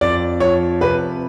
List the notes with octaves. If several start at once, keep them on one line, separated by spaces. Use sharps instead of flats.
F2 D5
F3 C#5
C3 B4